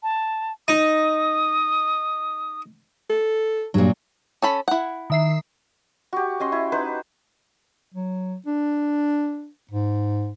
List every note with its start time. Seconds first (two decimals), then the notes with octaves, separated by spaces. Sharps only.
0.03 A5
0.68 D#4 D#6
3.10 A4
3.74 G2 A#2 F#3
4.42 C#4 A4 B5
4.68 E4 F#5
5.10 D#3 E5 C7
6.13 F#4 G4
6.40 C#4 D#5 C6
6.52 E4
6.72 D#4 B4 C5
7.94 F#3
8.46 D4
9.71 G#2